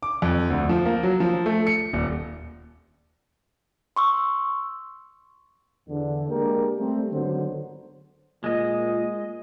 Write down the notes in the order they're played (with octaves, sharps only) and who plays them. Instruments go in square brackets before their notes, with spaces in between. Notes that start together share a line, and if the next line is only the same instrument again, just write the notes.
[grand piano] D6
F2
D2
F3
A#3
F#3
F3
A3
C#7
D#1
[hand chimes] C6 C#6 E6
[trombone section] E2 D3
G#3 A#3 D4 G4 A#4
G3 A3 C4
G#1 D3 F#3 B3 C5
[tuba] A#2 [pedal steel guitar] G#3 D#5